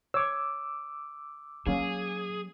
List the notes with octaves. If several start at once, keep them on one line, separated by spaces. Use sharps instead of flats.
C#5 D6 E6
F#3 A#3 C#4 G#4